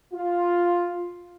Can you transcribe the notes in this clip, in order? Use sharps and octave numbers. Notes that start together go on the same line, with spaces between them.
F4